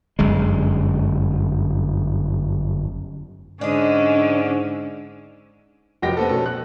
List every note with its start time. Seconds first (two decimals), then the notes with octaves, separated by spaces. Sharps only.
0.19 G1 F#2 G#3
3.61 G#2 D3 C#4 D4 D#5
6.02 F1 F3 F#3 G4 G5 A#6
6.17 B3 C4 A4
6.29 B2 C#4 A4
6.46 F#6